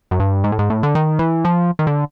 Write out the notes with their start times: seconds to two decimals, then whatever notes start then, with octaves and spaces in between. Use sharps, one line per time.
0.11 F#2
0.19 G2
0.44 G#2
0.52 A2
0.59 G#2
0.70 A2
0.83 D3
0.95 D#3
1.19 E3
1.45 F3
1.79 D#3
1.87 D3